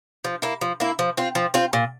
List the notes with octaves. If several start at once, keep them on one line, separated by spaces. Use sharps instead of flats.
F3
A#3 E4
F3
A#3 E4
F3
C4 F4
F3
C4 F4
A#2